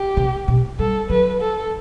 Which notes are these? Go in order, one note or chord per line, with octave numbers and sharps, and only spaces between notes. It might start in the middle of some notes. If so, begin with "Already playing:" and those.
Already playing: G4
C3
B2
G3 A4
F#3 B4
A4